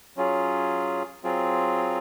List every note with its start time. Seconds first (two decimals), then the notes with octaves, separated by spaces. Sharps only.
0.17 F#3 C#4 F4 G#4
1.24 F#3 C4 F4 G#4